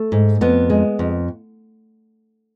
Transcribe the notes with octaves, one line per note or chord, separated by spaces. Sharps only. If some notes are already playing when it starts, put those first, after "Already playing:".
Already playing: A3
G#2
F2 B3
G#3
F2